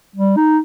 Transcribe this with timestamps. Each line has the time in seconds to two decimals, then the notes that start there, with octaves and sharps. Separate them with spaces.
0.16 G3
0.37 D#4